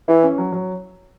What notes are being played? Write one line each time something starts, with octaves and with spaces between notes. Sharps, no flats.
E3 E4
C#4
F#3
F#3